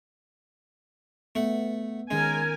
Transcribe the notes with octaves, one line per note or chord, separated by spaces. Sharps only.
A3 B3 F#5
D#3 G#3 C#4 A#4 G#5